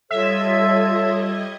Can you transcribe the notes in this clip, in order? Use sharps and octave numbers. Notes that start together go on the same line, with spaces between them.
G3 F4 A4 C#5 D#5 E5 G#6